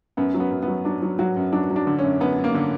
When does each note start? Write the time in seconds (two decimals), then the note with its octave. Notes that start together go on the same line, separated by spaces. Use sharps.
0.17 F#2 B3
0.34 F#3
0.40 B3
0.51 F#2
0.63 B3
0.68 F#3
0.85 F#3 D4
1.02 F#3
1.19 F#3 F#4
1.37 F#2
1.53 F#3 D4
1.70 F#3
1.76 D4
1.87 D3
1.99 C#4
2.03 F#2
2.20 F#2 B3
2.38 F#2
2.44 A#3
2.55 D3